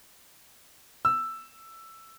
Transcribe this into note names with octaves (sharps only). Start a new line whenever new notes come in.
E6